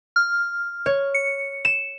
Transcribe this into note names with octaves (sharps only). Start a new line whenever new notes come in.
F6
C#5
C#7
E7